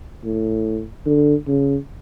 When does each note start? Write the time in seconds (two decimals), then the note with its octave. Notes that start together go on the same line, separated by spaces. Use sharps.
0.24 A2
1.06 D3
1.47 C#3